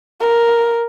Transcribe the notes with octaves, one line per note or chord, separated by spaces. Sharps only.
A#4